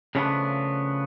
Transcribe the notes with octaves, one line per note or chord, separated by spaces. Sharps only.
C#3 F3 G3 A3 B3 D4